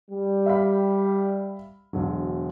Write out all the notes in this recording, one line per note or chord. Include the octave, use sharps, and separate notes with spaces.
G3
E5 F5 B5
E1 D3 F#3